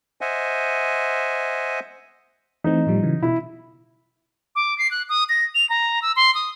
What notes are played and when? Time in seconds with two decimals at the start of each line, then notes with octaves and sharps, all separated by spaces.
0.21 C5 D#5 E5 F#5 G#5
2.64 E3 A3 C4 D#4
2.87 A2 F3 G3
3.03 C#3 E3 F#3
3.23 B2 E4
4.56 D6
4.78 C7
4.91 F#6
5.09 D#6
5.29 A#6
5.55 F7
5.70 A#5
6.02 E6
6.16 C6
6.35 D#6